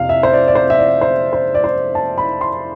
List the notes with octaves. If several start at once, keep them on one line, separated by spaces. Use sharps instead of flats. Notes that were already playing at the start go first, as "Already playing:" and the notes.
Already playing: F2 C3 F5
E5
C5
D5
D5
C5
E5
D5
C5
C5
D5
C5
A5
B5
C6